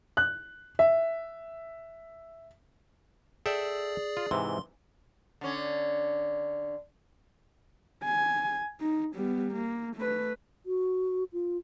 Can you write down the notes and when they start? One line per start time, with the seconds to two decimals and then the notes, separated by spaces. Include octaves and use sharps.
0.17 F#6
0.79 E5
3.46 G#4 A4 D5 E5 G5
4.17 F4
4.31 G#2 C3 E3 C6
5.41 D3 C#4
8.04 G#5
8.80 D#4
9.15 G3 B3
9.52 A#3
9.96 A3 B4
10.66 F#4
11.33 F4